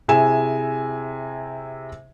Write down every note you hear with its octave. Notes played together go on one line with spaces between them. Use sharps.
C3 E4 G#4 G#5 E7